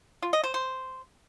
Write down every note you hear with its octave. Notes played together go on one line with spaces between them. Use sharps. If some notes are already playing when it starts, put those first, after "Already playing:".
F4
D#5
C5
C5